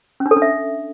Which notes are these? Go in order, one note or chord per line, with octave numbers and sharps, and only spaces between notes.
C#4
D4
A4
D4
E5